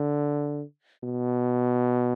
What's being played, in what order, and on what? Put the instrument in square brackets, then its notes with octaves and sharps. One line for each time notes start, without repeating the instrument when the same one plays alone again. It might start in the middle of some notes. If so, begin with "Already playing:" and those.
Already playing: [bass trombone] D3
B2